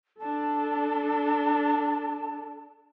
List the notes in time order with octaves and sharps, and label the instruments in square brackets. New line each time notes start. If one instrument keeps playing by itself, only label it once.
[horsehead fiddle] D4 A4 [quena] A5